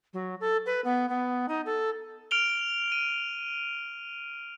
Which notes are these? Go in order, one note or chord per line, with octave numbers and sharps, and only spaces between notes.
F#3
A4
B4
B3
B3
D#4
A4
F6 D7 F7 G7
D#7